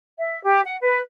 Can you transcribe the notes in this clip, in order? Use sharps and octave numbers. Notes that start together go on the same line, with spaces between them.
E5
G4
F#5
B4